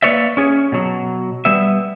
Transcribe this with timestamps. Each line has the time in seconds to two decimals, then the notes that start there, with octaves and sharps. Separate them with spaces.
0.03 A#3 B4 C#5 D5 E5
0.37 C#4 G#4 C#5
0.72 B2 F#3
1.45 G3 B3 E5